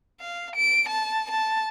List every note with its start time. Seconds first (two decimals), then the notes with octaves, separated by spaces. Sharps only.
0.20 F5
0.56 D7
0.88 A5
1.31 A5